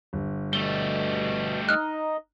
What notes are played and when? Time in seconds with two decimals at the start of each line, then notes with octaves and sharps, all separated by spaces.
0.13 G1
0.53 B2 G3 A3 G7
1.69 D#4 D#5 F6 F#6